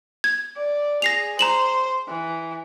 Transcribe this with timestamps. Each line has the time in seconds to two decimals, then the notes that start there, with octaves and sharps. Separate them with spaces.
0.24 G#6
0.57 D5
1.02 G#4 A#6 C7 F7
1.39 C5 A#5 E7 F#7
2.08 E3